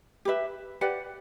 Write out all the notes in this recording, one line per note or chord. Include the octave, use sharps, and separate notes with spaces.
G4 B4 E5
G4 B4 D5 F#5